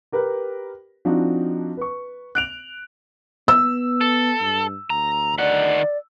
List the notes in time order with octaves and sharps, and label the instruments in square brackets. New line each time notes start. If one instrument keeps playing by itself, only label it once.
[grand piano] G4 A#4 B4
F3 C4 D4 D#4 F#4
B4 C#6
F#6 D7 F7
[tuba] B3 [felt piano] E6
[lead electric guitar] A4
[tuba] G2
[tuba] D2 [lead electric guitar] A#5
[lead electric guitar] D#3 F#5 [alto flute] D5